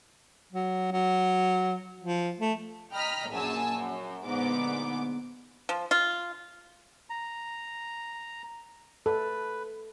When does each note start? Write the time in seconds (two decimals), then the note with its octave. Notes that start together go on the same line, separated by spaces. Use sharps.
0.53 F#3
0.92 F#3
2.00 F3
2.40 A3
2.92 D#5 G5 A#5 B5 F6 B6
3.30 A#1 F#2 G#4 G#5 A5 E6
3.73 F#2
4.25 A#1 G#2 D3 B3 D6
5.69 F3
5.91 F4
7.10 A#5
9.06 A4 B4